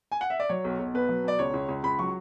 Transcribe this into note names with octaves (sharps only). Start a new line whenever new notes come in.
G#5
F#5
E5
D5
F#3 C#5
B1
B1
B2 B4
F#3
B2 D5
C#2 C#5
C#2
C#2
C#2 B5
F#3 C#6